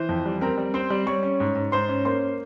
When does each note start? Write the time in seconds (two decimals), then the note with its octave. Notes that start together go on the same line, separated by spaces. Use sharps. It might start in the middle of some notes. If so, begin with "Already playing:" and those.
Already playing: E3 C5
0.09 F2
0.26 G3
0.41 C4 A#4 A#5
0.58 G3
0.74 C4 C5 C6
0.90 G3
1.06 G3 C#5 C#6
1.23 C#4
1.40 G#2
1.55 G#2
1.72 G#2 C5 C6
1.89 C#4
2.05 A#3 C5 C6